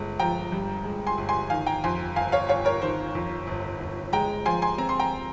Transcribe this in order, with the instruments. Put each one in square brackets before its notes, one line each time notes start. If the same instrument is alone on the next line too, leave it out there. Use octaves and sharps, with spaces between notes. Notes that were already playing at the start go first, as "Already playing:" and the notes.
Already playing: [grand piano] G1 G#3
F3 G5 A#5
G2
G#3
G#5 C6
G1
G#5 C6
D#3 F5 G#5
G5 A#5
F2 G#5 C6
G1 F5 G#5
C#5 F5
G1 C#5 F5
A#4 C#5
D#3 C5
F2
G1
G1
G#3 G5 A#5
F3 G#5 C6
G#5 C6
C4 A#5
C6
G5 A#5